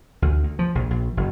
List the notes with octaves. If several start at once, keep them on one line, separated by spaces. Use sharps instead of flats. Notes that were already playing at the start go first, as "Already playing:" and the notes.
D2
D2
F3
A#1
A#1
F#1